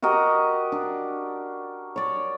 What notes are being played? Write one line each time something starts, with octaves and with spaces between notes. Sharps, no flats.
F#4 G4 A#4 D#5
D4
C#5 D5